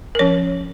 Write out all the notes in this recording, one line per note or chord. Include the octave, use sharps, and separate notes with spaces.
A#4
F3 C#4 C#5